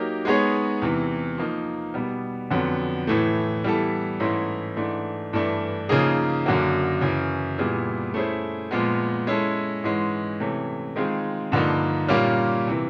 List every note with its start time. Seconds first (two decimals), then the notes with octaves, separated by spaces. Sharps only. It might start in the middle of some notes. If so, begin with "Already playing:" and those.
Already playing: F#3 A#3 D#4 G4 A#4
0.25 G#3 B3 D#4 G#4 C#5
0.82 E2 C3 E3
1.38 F3 A#3 D#4
1.94 B2 G3 B3
2.51 F2 D3 F#3 B3
3.07 A2 E3 A3
3.64 E3 G3 B3 E4 A4
4.20 G#2 E3 A3 C#4 E4
4.76 G#2 E3 A3 D4
5.33 G2 E3 A3 D4
5.89 C#3 F3 A#3 D#4 G#4
6.46 F#2 D3 F#3 A#3
7.01 F#2 C#3 E3
7.58 A#2 G3 B3 E4 G#4
8.14 A3 C#4 E4 G#4 C5
8.71 A#2 F3 G#3 B3
9.27 G#3 C#4 E4 A4
9.84 G#2 E3 G#3 C#4
10.40 C3 E3 A3 C#4
10.96 D#3 G#3 C4 F4 G#4
11.52 G2 D3 F3 A#3 D#4
12.09 A#2 G3 A#3 C#4 F4
12.67 C3 E3